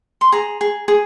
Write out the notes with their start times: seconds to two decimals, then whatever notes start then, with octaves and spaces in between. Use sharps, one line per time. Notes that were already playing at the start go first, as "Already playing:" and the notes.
0.21 C6
0.32 G#4 A#5
0.61 G#4
0.88 G#4